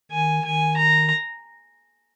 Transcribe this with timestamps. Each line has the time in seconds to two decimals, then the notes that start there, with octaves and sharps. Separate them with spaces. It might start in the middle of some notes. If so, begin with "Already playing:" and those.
0.11 D#3 G#5
0.44 D#3 G#5
0.77 A#5